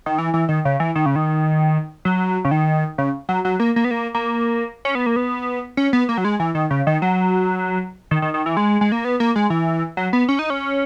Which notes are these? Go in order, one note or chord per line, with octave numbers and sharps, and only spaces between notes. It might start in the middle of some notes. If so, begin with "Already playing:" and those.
D#3
E3
E3
D#3
C#3
E3
D#3
C#3
D#3
F#3
C#3
D#3
C#3
F#3
F#3
A#3
A#3
B3
A#3
A#3
C#4
B3
A#3
B3
C#4
B3
A#3
F#3
G#3
E3
D#3
C#3
D#3
F#3
D#3
D#3
D#3
E3
G#3
G#3
A#3
B3
A#3
G#3
E3
F#3
B3
C#4
D#4
C#4